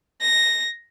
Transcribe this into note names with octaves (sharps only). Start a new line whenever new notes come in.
A#6